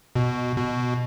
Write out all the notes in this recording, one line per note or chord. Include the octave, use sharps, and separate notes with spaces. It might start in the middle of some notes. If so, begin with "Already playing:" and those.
B2
B2